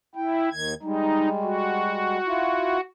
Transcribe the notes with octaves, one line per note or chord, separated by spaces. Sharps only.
E4 G5
D#2 D#3 G#6
G3 G#3 D#4
F#4
E4 F4